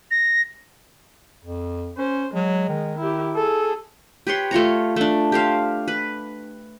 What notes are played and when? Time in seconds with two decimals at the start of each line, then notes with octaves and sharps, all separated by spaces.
0.11 A#6
1.45 F2
1.98 C#4 C5
2.34 F#3 G#3
2.69 D#3
2.99 E4 G4
3.36 G#4 A4
4.27 G4 B4 C#5 C6
4.51 A3 F4 C#5 A#5
4.96 A3 D4
5.32 G4 C5 F5
5.88 B4